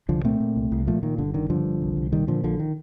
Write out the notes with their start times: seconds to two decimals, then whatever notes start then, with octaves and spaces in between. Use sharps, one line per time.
0.09 C2 D3 F3
0.24 A#2 A3 C4
0.40 A#2
0.56 C2
0.71 C2
0.87 A#2 F3 A3
1.03 A#2 D#3
1.18 G1 D3
1.34 D3 D#3
1.49 G2 D3 F3
1.65 G1
1.81 C2
1.97 C2
2.12 A#2 D#3 G3
2.27 A#2 D3 F3
2.43 A#1 D3 F3
2.59 D#3